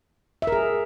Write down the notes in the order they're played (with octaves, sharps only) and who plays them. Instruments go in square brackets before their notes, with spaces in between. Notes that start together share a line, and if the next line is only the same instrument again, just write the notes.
[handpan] E5
A#4
G#4